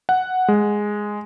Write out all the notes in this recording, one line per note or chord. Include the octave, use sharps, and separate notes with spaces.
F#5
G#3